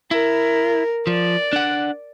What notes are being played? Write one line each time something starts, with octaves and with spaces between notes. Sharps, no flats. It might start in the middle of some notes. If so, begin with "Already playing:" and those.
E4 A#4
F3 D5
D4 F#5